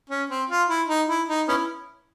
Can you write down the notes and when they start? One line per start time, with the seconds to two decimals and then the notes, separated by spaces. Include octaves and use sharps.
0.10 C#4
0.30 C4
0.49 F4
0.69 E4
0.88 D#4
1.09 E4
1.28 D#4
1.48 B3 C#4 E4